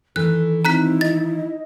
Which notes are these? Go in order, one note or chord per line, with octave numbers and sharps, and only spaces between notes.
D#3 E3 A4 F#6
C4 D#4 E4 A#5 F#6 B6
D#5 A6